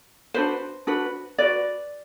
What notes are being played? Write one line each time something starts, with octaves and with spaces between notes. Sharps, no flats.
D4 F#4 B4 C5
D4 F#4 B4
F#4 B4 D5